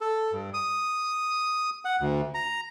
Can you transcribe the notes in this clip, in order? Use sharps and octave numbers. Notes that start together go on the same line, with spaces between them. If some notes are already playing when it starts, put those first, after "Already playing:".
A4
G2
D#6
F#5
D2
A#5